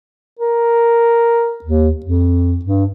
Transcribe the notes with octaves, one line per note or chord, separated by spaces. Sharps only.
A#4
D#2
F2
G2